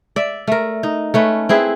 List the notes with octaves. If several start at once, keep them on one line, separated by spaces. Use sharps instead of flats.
D5 E5
A3 A#4
D#4
A3 C#4 B4
C4 E4 G#4 B4